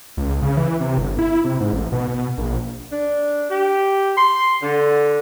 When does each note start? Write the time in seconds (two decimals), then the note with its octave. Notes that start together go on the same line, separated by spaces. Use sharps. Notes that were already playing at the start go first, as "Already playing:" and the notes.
0.17 C#2
0.42 C#3
0.57 E3
0.80 C3
0.98 G1
1.19 E4
1.45 C3
1.60 G#2
1.73 A1
1.92 B2
2.08 B2
2.38 A#1
2.92 D4
3.50 G4
4.18 C6
4.62 D3